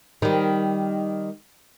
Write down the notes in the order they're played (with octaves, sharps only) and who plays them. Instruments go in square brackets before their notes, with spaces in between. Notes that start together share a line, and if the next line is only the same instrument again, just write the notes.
[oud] D#3 G3